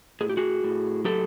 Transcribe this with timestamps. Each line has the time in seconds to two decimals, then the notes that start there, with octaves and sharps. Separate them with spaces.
0.21 A2 G#4
0.29 G4
0.37 F#4 G#4
0.64 A2
1.05 F#3 G4 A4